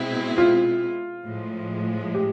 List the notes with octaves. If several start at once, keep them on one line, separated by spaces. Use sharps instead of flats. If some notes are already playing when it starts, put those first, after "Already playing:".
Already playing: B2 G#3 C4 E4
F4
A2 F3 G#3
G4